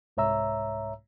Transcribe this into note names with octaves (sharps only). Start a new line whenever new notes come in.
C2 G#2 C#5 E5 A#5 E6